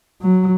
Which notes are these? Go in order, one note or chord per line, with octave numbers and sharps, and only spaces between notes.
F#3